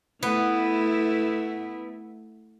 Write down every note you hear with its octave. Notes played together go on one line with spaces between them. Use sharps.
A3 B3 E4